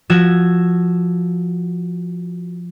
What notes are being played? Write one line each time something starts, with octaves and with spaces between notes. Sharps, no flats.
F3 F#4 E6 G#6